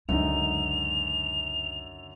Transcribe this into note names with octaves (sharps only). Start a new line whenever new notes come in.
C#2 F#2 D3 G#3 D#4 F7